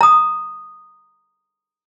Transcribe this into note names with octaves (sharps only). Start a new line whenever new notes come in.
A#5 D#6